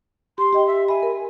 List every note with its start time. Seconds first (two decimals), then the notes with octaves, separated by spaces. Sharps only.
0.38 G4 C6
0.53 G4 D#5 G5
0.66 E5
0.88 E5 G#5 B5
1.03 A#4